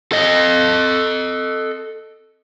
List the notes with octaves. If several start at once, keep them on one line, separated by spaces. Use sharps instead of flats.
A4 D#5